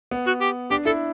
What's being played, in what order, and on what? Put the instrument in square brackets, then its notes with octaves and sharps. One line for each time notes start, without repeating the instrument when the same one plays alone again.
[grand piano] B3
[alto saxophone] F#4
G4
[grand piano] D4 [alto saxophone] G4
[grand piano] E4 [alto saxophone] A4